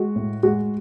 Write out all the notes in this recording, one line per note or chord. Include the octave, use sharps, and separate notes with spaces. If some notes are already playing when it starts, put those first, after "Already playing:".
Already playing: G#3 F#4
A2
G#3 F#4